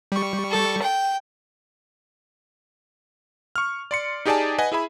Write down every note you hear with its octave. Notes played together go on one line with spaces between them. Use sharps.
G3 C#6
A4
G5
C#6 F6
D5 C6 C#7
D#4 G4 G#4 D5 G#5 A5
B4 D#5 F#5 G#5
E4 G#4 E5 B5